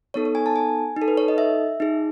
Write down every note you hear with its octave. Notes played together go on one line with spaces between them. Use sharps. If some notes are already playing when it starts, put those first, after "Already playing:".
B3 D#4 A4 C#5
C#5
G#5
A5
G#5
D#4
A4
B4
C#5
D#5
E5
D#4 G#4